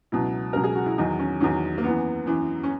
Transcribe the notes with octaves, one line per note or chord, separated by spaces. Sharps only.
C#2 B2 F#3 E4
C#2 B2 F#3 A#4
G#4
F#4
E4
E2 D#3 F#3 D#4
C#4
E2 D#3 F#3 C#4
A#3
F#2 E3 B3
F#2 E3
C#4